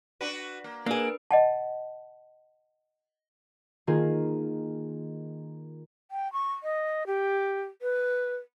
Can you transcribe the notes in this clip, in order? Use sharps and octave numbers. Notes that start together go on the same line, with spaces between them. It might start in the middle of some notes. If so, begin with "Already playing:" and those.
D4 F#4 B4
A#3
A#3 D4 G#4 A#4 B4
D#5 F#5 A5
D#3 A#3 F4 G#4
G5
C#6
D#5
G4
B4